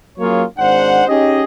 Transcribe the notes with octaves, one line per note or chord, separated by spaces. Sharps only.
F#3 A#3 C#4 F4 G#4 C#5
G#1 G#2 D4 C5 F#5
C#4 D#4 G4 G#4 D#5